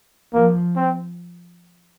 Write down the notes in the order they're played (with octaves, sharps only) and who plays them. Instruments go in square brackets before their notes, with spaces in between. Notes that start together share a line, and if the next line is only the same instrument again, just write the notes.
[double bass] F3 [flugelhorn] A#3
[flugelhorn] C4